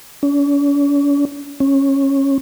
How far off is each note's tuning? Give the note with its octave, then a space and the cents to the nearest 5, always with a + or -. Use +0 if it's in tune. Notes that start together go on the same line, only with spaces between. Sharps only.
C#4 +45
C#4 -15